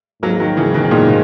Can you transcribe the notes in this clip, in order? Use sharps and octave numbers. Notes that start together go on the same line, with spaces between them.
G#2 F#3 A#3
D#3 F#3
G#2 C#3 E3
B2 D#3
D#3
A#2 C#3